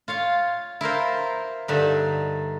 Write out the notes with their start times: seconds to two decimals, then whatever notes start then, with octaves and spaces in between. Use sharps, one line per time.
0.08 F4 C#5 F5
0.81 E4 F4 A#4 C5
1.68 G2 D3 D#4 E5